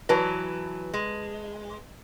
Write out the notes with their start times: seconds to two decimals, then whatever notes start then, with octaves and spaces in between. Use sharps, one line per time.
0.09 E3 F#3 B4 A5
0.94 G#3